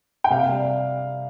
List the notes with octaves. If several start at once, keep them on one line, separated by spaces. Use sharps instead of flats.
G5
C3 F5
G3